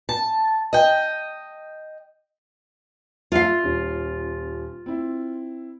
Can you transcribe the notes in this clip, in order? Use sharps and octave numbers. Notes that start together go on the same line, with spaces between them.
A5
D#5 G5
F4 E5 F5
D#1 C#4
C4 E4